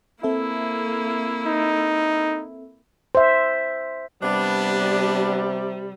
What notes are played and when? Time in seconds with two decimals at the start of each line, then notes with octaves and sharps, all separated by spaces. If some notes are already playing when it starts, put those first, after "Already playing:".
0.23 A#3 C4 E4 A4 E5
1.46 D#4
3.15 C5 E5
4.23 C3 G3 B3 D4